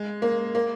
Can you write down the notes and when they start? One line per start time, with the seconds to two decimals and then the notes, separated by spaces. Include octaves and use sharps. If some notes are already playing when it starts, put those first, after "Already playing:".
Already playing: G#3
0.22 A#3
0.55 A#3